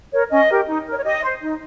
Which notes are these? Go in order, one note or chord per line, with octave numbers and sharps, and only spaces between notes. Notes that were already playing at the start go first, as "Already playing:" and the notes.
A#4 C#5
C#4 D#5
G4 A#4
D#4
A#4 C#5
C#5
G4 D#5
C5
D#4